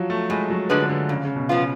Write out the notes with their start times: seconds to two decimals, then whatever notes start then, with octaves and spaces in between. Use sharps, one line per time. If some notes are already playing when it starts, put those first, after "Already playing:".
Already playing: F3 F#3
0.10 A3
0.30 A2 G#3
0.50 F#3
0.70 D3 G#3 D4 G#4 B4
0.89 D3
1.09 F2 C#3
1.25 C#3
1.36 B2
1.49 F3 B3 F4
1.57 C#3